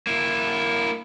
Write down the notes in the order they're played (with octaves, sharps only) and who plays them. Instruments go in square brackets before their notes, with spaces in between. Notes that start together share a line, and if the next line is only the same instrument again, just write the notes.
[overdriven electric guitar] A#3 E4